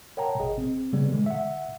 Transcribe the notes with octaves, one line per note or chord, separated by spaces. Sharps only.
A#4 C#5 F#5 G5 A5 A#5
G#1 G#4 D#5
C4
C#3 G3 B3
D3 E3 G#3
E5 F#5